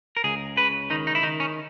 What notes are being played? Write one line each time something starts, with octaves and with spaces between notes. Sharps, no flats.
A#4
C#2 G#4
C#3 B4
D#3 D#4
D#4
E4
D#3 D#4
C#4